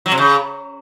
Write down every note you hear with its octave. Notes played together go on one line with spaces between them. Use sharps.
F#3
C3
C#3